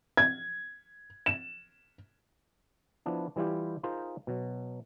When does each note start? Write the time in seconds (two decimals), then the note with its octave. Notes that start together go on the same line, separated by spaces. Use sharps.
0.17 G#6
1.26 E7
3.06 F3 B3 D4 E4
3.36 E3 G3 E4 F4 G4
3.83 D#4 F4 G#4 A#4 C5
4.27 B2 F#3